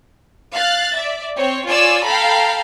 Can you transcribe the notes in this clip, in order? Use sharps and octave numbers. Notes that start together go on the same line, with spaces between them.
F5 F#6 A6
D5 E5
C4 C#5
F4 C#5 D5 G#5 E6
A4 F5 G5 A#5 B5